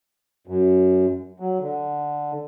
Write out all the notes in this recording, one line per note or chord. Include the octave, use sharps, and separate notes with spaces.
F#2
F#3
D3